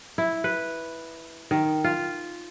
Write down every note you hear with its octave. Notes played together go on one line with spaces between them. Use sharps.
E4
B4
D#3
F4